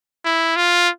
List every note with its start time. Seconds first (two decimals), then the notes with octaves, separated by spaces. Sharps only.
0.25 E4
0.56 F4